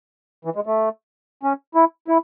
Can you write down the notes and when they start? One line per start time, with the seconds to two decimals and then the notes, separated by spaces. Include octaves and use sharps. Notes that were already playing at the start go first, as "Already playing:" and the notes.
0.45 E3
0.55 G#3
0.66 A3
1.43 C#4
1.75 E4
2.08 E4